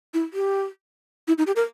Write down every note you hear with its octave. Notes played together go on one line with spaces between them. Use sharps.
E4
G4
E4
D#4
G4
A#4